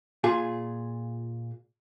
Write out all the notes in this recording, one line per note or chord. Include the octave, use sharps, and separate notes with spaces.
A#2 F4 G#4